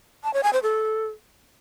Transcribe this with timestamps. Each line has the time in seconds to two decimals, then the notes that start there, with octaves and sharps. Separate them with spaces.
0.24 A5
0.34 C#5
0.43 G#5
0.53 C5
0.63 A4